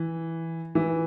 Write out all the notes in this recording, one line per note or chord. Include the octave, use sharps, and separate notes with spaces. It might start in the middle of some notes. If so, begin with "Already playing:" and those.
Already playing: E3
E3